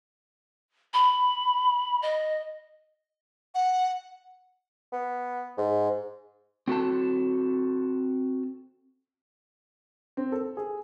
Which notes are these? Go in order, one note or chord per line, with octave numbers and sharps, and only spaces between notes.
B5
D#5
F#5
B3
G#2
C4 F#4 A4 A5
C4
A4
G#4